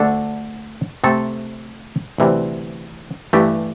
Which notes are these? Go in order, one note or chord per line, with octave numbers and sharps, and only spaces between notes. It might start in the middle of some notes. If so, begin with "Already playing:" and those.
Already playing: D2 D3 A3 D4 A4
C3 A3 C4 A4
D2 C3 E3 G3
G2 E3 A3 E4 G4